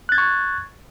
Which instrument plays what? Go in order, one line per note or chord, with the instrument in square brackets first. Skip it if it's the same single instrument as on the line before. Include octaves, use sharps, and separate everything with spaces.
[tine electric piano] F#6
A6
G#6
C#6